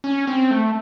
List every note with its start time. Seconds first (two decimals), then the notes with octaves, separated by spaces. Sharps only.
0.04 C#4
0.27 C4
0.51 A3